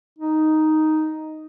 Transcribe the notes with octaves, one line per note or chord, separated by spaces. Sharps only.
D#4